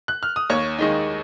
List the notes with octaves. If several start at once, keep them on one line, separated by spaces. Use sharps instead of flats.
F#6
F6
D#6
D#2 C#5 C#6
D#3 G#3 D#4